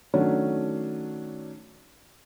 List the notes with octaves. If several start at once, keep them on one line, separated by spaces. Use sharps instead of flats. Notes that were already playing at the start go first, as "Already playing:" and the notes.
D#3 F#3 A3 C#4 D4